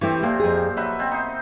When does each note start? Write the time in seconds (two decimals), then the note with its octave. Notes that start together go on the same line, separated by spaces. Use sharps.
0.01 E3 A3 C4 E4 G4 C#5
0.23 A#2 F3 A#3 C4
0.39 F2 G#4
0.77 F#3 B4 D#5 E5
0.99 B2 C4
1.11 D#4 C5